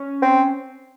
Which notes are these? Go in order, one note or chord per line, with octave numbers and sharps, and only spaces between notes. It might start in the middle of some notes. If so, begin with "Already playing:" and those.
Already playing: C#4
C4